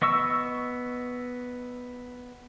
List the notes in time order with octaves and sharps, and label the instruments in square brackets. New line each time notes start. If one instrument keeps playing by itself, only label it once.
[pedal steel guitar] B3 D#5 C#6 E6